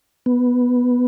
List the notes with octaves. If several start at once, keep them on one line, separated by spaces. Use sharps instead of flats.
B3